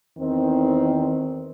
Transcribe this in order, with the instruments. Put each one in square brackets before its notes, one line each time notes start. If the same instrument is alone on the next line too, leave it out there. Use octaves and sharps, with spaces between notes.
[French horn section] E2 D#3 C4